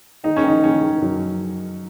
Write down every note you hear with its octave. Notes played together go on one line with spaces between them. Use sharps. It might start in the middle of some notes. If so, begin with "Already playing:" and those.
D#3 D#4
C#4
D#3 D#4
D#3 C#4
D#3
F#2